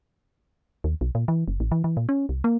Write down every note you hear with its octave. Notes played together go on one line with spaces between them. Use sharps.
D#2
B1
A#2
E3
F#1
A1
E3
E3
A#2
C#4
C2
A#3